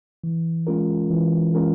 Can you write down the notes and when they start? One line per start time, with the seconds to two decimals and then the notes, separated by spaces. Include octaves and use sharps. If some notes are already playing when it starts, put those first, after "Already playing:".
0.24 E3
0.67 G#3 C#4 F4 A#4
1.10 E3
1.55 G#3 C#4 F4 A#4